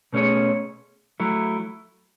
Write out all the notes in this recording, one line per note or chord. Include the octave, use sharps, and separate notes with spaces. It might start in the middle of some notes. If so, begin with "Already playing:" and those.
B2 A3 C#4 G#4 C#5
F#3 A3 E4